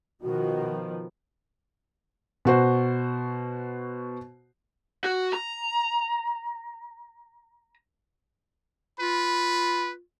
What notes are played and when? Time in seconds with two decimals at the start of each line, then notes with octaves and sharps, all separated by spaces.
0.22 B2 D#3 F3 F#4
2.45 B2 F#4 C5
5.04 F#4
5.33 A#5
9.00 F4 B4 B5